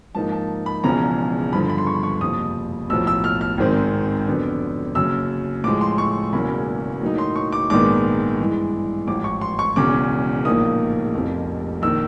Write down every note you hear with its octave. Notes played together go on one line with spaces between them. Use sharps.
G#2 F3 A#3 D#4 A5
A5
B5
E1 E2 C#3 F3 A#5
G2 D3 F3 B5
B5
C6
C#6
C#6
F#1 F2 C3 F3 D#6
B1 A2 F3 E6
E6
F6
F6
G#1 G#2 D#3 G#3 C4
F2 D3 F#3 B3 D4
F#1 F#2 C#3 E6
A2 F3 G#3 D6
C6
C#6
E1 E2 C#3 F#3 A#3 B5
A2 F#3 A#3 D#4
C6
C#6
D6
A#1 G#2 D#3 G#3 B3 D6
G2 E3 G#3
A1 G#2 F3 D6
C#6
C6
C#6
E1 E2 C#3 D6
A#1 A2 F3 A#3 D#4 D#6
F1 F2 C3 F3 A#3
A#1 D#3 E6